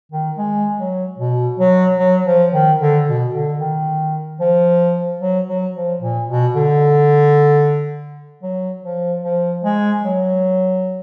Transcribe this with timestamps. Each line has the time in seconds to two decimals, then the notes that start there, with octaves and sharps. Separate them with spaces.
0.12 D#3
0.38 G#3
0.79 F#3
1.19 B2
1.59 F#3
1.99 F#3
2.27 F3
2.54 D#3
2.80 D3
3.07 B2
3.33 D3
3.60 D#3
4.40 F3
5.21 F#3
5.48 F#3
5.75 F3
6.01 A#2
6.28 B2
6.55 D3
8.43 F#3
8.84 F3
9.24 F3
9.64 G#3
10.04 F#3